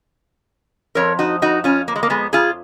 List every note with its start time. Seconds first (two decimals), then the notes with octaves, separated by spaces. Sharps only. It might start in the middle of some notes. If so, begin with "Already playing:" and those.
0.95 F2 F3 A#4 C#5
1.19 D#4 F#4
1.42 D#4 F#4
1.64 C#4 F4
1.88 A#3
1.96 G#3
2.03 A#3
2.10 G#3 B3
2.33 F4 G#4